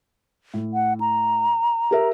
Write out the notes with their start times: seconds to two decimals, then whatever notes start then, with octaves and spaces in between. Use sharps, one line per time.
0.54 A2
0.74 F#5
1.00 A#5
1.91 G4 A#4 E5